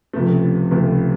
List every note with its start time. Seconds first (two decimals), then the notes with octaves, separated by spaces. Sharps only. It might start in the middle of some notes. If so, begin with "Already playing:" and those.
0.13 C#2 C3 F3 A3
0.71 C#2 C3 F3 A3